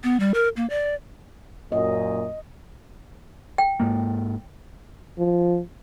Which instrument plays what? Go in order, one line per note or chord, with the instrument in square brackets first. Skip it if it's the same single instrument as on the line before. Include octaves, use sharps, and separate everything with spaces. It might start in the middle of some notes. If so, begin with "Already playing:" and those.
[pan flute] B3
G3
A#4
A#3
D5
[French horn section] F#2 A#2 [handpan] D#5
[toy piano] G5
[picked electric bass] G#2 G#3 A#3
[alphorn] F3